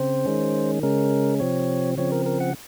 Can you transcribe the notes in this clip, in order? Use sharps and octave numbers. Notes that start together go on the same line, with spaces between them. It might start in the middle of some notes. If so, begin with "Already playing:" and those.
Already playing: C#3 C4 C5
D#3 G#3 C#4
C#3 G#3 C#4 A#4
C3 F3 C4 C#5
C#3 F3 C4 C#5
A#4
A#4
F#5